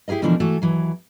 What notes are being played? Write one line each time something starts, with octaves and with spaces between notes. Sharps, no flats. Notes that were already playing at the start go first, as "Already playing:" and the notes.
E4 G4 G#4 A#4 D#5
B2 D3 E3 F3 D4 A#4
E3 A3 F#4 A4
D#2 E3 F#3